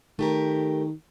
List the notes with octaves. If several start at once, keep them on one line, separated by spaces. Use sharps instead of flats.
D#3 A3 G4 A#4